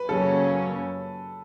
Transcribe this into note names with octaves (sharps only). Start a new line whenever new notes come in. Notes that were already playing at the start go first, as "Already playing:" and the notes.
Already playing: B4
F#2 C#3 F#3 A#3 C#4 A4